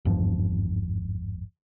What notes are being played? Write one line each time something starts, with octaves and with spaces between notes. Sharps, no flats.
G#1 E2 G2 F3